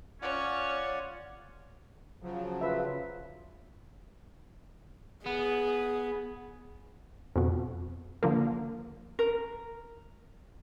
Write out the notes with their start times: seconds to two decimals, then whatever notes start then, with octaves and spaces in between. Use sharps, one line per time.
0.22 C#4 F4 C#5 D5 F#5
2.22 C#3 F3 F#3
2.61 F4 B4 E5
5.26 B3 G#4
7.36 F2 B2
8.23 D3 F3 A#3
9.19 A#4